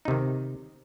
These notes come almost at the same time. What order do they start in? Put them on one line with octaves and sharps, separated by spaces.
D#4 C3 D#3